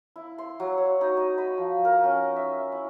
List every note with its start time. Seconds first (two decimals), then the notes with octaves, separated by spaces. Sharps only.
0.16 E4
0.38 C6
0.60 F#3
0.78 C#5
1.01 D#4
1.17 D#5
1.38 B5
1.58 F3
1.85 A#4
2.04 C#4
2.36 E5
2.72 E4